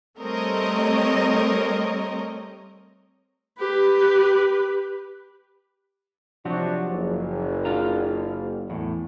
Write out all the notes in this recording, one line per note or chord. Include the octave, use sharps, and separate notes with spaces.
G3 A3 C4 A#4 C#5 D#5
G4 B4
C3 F3 F#3 D4 F#4 G4
F#1
D4 F4 A#5
E2 A2